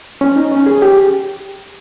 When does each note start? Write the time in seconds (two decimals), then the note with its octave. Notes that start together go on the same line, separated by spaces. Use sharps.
0.21 C#4
0.36 D#4
0.52 C#4
0.66 G#4
0.82 G4